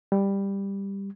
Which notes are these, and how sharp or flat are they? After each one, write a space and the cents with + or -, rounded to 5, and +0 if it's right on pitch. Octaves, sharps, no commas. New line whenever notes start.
G3 +10